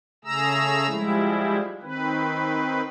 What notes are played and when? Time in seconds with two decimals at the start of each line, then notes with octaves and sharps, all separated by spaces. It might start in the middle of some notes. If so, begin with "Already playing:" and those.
0.24 C#3 A3 G#4 A#5 E6
0.88 F3 G3 G#3 E4
1.82 D#3 C4 B4